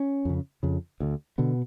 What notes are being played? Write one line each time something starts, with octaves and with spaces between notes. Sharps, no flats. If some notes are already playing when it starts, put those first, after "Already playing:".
Already playing: C#4
F2 C#3
F2 C#3
D2 D3
B2 D3 B3